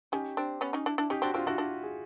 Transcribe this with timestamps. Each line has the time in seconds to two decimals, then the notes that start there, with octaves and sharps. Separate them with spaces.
0.12 C#4 D#4 G4
0.37 C4 D4
0.61 B3 C#4
0.73 C#4 D#4
0.86 D4 E4
0.98 D4 E4
1.10 C#4 D#4 G4
1.22 C4 D4 F#4
1.34 C4 D4 F4
1.47 D4 E4 F#4
1.58 D4 E4
1.83 G#4